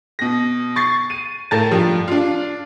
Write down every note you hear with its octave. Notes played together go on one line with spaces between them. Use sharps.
B2 A#6
C#6 A6 C7
D#7
A2 A#4 A5 A6
G2 F3
D4 F4